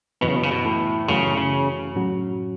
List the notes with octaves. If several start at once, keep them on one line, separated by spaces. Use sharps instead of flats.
F#2 B2 E3 B3
C#3
B2
C#3
B2
A2
F#2 C#3 E3 A3 F#4
C#3
A2 F#3 C#4 F#4